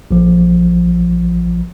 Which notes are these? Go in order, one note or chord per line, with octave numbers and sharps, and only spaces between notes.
A#1 F3